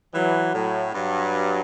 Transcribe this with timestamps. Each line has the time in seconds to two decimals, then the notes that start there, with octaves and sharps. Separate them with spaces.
0.15 E3 F#3
0.54 A2 F#3
0.94 G2 F#3